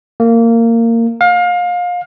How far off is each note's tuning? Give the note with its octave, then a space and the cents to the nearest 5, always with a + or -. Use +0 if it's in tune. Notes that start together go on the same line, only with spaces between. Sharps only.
A#3 -20
F5 +30